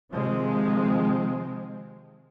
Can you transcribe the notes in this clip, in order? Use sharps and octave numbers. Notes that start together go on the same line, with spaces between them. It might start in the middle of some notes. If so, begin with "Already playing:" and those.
C3 D#3 F3 G#3 C4